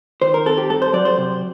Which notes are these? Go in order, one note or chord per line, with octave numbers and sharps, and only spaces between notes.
D#3 C5
A#4
C4 A4
G4
G2 A4
C5
F#3 D5
C5
C3